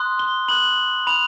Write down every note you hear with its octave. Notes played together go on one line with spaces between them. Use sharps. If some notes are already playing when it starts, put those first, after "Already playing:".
Already playing: C6 D#6 F#6
G7
B5 D#6 F#6 F#7
B5 D#6 F#6 F7